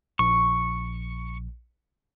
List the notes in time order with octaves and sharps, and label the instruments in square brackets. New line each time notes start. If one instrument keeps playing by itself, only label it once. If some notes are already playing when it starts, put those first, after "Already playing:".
[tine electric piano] A#1 [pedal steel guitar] C#6